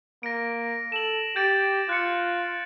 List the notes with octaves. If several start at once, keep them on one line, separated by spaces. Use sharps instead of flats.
A#3 A#6 D7
A4 E7 F#7
G4 G6 A6 D7
F4 F#6 C#7